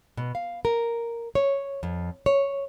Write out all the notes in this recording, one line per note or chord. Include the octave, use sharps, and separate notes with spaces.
B2
F5
A#4
C#5
F2
C#5